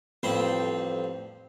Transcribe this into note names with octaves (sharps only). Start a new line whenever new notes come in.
A1 F2 G3 C4 C6